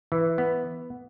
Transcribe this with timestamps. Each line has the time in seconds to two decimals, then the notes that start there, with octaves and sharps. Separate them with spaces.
0.12 E3
0.38 B3